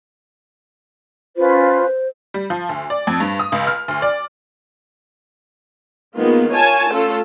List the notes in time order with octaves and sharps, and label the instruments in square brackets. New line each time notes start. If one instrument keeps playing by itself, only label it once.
[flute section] C#4 F4 B4 [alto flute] C5
[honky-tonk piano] G3
F3
D2
D5
F2
G2
D#6
C#2
F6
D2
D5
[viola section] D#3 G#3 A#3 B3 F4
F4 A#4 C#5 G#5 A5
A3 C#4 F4 A4